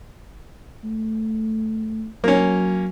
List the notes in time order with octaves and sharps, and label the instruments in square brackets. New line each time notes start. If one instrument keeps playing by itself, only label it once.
[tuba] A3
[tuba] F#3 [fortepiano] A#3 C#4